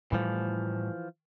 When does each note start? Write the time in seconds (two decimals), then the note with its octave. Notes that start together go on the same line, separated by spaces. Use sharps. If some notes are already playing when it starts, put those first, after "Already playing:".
0.12 A2 E3 F3 G3 A3